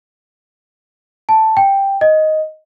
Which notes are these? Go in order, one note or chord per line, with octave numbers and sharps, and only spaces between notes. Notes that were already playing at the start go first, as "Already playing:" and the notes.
A5
G5
D#5